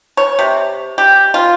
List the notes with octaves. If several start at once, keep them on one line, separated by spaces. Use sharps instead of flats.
C#5
C3
G4
F4